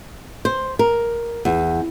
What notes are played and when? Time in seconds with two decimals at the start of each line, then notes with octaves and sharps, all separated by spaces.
0.45 C5
0.79 A#4
1.45 E2